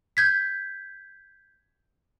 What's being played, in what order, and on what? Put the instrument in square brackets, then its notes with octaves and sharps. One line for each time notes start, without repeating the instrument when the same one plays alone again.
[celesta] G6 G#6 B6